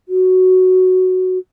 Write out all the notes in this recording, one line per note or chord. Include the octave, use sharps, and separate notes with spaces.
F#4